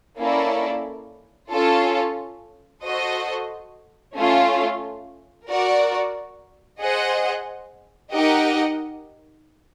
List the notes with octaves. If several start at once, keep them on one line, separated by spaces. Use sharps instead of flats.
A#3 C#4 E4 A4 D5
C#4 F4 A4
F#4 A4 C5 D#5
A3 C#4 F4
F#4 A#4 D5
G#4 C5 D#5 F#5
D#4 G4 A#4 D#5 F#5